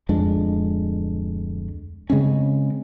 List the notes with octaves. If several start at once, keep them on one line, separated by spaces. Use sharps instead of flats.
D1 F2 G#3 D4
C#3 G#3 C4 C#4